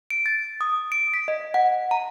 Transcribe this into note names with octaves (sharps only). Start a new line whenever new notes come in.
D7
A6
D#6
D7
B6
D#5
F#5
A#5